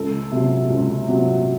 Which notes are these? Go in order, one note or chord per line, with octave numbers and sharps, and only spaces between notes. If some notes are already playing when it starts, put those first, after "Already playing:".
Already playing: C#2 A4
C3 F#3
C#2
C3 F#3